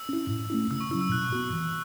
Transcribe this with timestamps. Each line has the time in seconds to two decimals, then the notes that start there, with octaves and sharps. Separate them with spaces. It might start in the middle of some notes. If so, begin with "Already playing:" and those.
Already playing: E6
0.09 C#4 E4
0.29 A2
0.50 A3 C#4 E4
0.71 C#3 E6
0.80 C#6
0.91 F#3 C#4 E4 E6
1.01 E6
1.12 B2 F#6
1.32 B3 F#4
1.53 E3